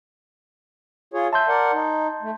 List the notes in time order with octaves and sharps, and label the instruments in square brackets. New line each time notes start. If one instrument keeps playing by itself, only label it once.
[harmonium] F4 G#4 C#5
[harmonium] E5 [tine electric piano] A5 C6 G6
[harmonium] A#4 D5 F#5
D#4
A3